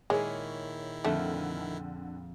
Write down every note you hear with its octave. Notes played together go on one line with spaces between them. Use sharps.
A#2 D#3 G#3 E4 G#4 C#5
F2 D3 A3